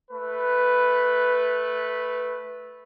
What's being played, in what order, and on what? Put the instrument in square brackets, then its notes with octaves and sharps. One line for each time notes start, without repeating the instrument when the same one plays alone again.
[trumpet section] A3 B4